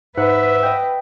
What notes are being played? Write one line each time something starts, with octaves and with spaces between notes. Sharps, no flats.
G#2 B4 E5 F#5
D#5 G5